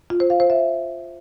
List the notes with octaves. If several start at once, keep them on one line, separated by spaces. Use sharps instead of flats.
F4
C5
F5
C5
E5